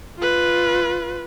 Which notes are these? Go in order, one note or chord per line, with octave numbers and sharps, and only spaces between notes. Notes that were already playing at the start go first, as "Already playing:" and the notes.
F4 B4